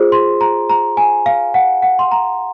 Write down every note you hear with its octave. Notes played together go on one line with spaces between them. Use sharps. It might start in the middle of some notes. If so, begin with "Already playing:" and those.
Already playing: F4 G#4 C5
C6
A#5
A#5
G#5
F5
F#5
F#5
C6
A#5